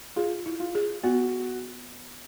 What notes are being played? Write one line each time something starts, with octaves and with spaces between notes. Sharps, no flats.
F4 G#4
E4
F4
G#4
B3 F#4